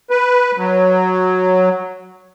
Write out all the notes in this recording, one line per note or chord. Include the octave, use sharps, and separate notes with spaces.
B4
F#3